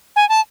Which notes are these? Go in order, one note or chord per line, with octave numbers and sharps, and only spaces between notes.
G#5
A5